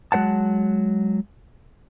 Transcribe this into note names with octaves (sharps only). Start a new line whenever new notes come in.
F#3 G#3 C5 F#5 A5